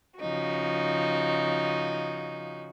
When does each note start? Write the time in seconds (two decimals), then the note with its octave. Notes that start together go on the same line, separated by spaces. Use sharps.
0.20 C#3 F3 D#4 F#4